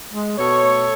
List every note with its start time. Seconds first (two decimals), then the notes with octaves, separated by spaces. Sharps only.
0.11 G#3
0.36 B2 A4 C#5
0.61 A3